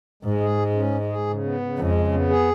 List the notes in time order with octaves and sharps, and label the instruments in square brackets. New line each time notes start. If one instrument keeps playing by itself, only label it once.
[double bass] G#2 [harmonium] G#3
[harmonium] G#4
G#3
C#4
G#3
G#4
C#3
B3
C#3
[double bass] F2 [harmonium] G#3
[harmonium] C#3
B3
G#4